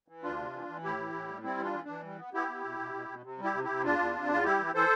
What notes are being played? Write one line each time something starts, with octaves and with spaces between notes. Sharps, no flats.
E3
D2 D4 F4
C3
E3
E3
A2 E4 G4
E3
A2
G3
G3 C4 E4
E3 D4 F4
E3
E3 D4
G3
B3
B3 E4 G4
B3
B2
B2
B2
B2
C3
G3
E4 G4
C3
E4 G4
C3
E2 D4 F4
E2
C3
E2 F4
G3 E4 G4
E3
E3 A4 C5